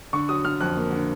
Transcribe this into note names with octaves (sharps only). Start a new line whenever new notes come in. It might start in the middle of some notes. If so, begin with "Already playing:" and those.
D3 C#6
F#3 D#6
D3 F6
F2 F#6
A#3
D3